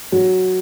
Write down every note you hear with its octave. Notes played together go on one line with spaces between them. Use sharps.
F#3